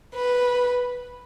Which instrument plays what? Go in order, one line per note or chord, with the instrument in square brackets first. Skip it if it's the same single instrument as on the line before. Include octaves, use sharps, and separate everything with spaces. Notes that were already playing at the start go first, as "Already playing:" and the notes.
[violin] B4